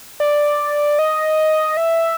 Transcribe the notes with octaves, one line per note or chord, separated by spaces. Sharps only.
D5
D#5
E5